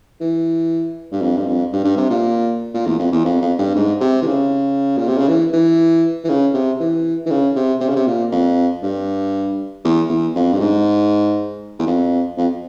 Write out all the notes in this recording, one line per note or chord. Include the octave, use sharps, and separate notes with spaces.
E3
G2
F2
G2
F2
G2
G2
C3
A#2
A#2
E2
F2
E2
F2
F2
G2
G#2
C3
E3
C#3
A#2
C3
C#3
E3
E3
E3
C#3
C3
E3
E3
C#3
C3
C3
C#3
C3
A#2
F2
G2
E2
E2
F2
G2
G#2
E2
F2
F2